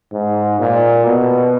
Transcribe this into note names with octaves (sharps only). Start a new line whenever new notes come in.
G#2
A#2
B2